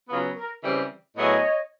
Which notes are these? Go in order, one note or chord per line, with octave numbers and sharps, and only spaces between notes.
C#3 F#3 B3 F4
A#4
C#3 E3 G3 C4
A2 F#3 B3 E4 G#4 C#5 D#5